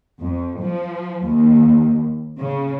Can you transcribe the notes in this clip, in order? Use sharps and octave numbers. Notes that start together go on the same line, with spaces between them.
F2
F3
D#2
C#3